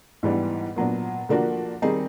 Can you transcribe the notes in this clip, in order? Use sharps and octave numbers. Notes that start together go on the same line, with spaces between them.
G#2 E3 G3 B3 D4
A#2 F#3 B3 D4
D3 F3 A#3 D4 F#4
D#3 G3 C4 D#4 G#4